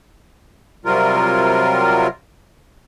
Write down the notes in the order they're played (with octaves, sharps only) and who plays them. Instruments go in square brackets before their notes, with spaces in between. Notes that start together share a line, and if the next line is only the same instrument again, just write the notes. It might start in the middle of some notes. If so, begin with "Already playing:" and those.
[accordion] C3 F#3 G3 F4 A#4